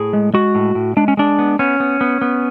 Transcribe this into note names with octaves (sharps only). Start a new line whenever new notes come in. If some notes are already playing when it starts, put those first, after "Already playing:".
Already playing: A2 G#4
G#3
G#3 F#4
A2
A2
G#3 D4
C#4
G#3 D4
B3
B3 C#4
B3
B3
B3